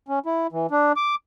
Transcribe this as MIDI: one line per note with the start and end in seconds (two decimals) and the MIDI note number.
0.08 0.19 61
0.26 0.47 64
0.52 0.67 52
0.71 0.92 62
0.96 1.15 86